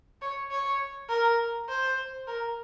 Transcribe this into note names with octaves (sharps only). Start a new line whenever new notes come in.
C#5
C#5
A#4
C5
A#4